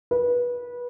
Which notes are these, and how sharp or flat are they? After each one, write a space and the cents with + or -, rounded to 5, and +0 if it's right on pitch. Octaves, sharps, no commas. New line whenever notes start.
B4 -20